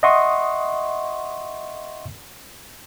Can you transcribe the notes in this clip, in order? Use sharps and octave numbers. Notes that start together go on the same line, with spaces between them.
D#5 E5 F#5 C6 C#6 D#6